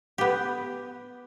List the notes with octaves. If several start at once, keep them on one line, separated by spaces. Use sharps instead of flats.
B3 G4